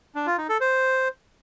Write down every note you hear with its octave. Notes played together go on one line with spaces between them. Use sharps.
D4
F4
D#4
A4
C5